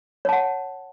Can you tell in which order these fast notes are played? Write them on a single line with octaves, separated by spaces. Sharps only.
C#5 A5 F#5